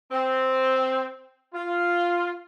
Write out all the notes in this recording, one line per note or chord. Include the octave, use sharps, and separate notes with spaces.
C4
F4